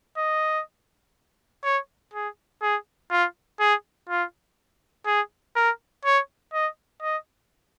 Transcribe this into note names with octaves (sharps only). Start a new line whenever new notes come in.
D#5
C#5
G#4
G#4
F4
G#4
F4
G#4
A#4
C#5
D#5
D#5